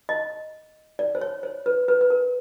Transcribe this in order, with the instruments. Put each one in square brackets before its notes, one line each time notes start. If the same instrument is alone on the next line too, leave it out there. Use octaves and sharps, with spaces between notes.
[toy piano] D#5
D5
C5
C#5
C5
B4
B4
B4
A#4